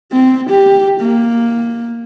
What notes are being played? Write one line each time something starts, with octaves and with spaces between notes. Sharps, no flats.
C4
G4
A#3